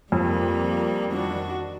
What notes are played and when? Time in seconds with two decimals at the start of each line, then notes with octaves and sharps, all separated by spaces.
0.12 F2 G3 A#3
1.12 D#3 D4 F#4